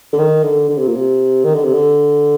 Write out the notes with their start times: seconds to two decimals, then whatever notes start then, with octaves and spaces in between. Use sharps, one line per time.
0.13 D3
0.19 D#3
0.43 D3
0.69 D3
0.78 C3
0.87 A#2
0.95 C3
1.44 D#3
1.54 D3
1.64 C3
1.73 D3